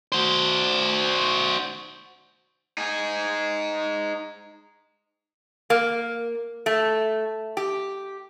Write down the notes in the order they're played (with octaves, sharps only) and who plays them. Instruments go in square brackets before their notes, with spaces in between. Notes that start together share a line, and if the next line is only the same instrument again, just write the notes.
[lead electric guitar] F#4 C5
[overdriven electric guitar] D#4 G#4
[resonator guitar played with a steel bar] A#3
A3
G4